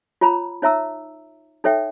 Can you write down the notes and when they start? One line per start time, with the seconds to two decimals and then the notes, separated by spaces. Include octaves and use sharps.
0.21 F4 C#5 A#5 B5
0.62 D#4 C#5 E5 A#5 E6
1.64 D#4 A4 C#5 E5 G5